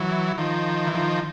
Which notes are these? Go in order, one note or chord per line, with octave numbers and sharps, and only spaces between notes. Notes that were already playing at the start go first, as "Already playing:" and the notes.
Already playing: E3 F#3
D#3 F3
E3
D#3 F3